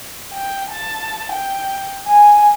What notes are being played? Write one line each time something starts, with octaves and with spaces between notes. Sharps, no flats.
G5
A5
G5
G#5